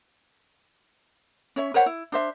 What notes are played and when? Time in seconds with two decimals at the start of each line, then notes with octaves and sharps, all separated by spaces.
1.56 C#4 C#5 E5
1.74 A#4 C5 C#5 F#5
1.86 E4
2.12 D4 C5 E5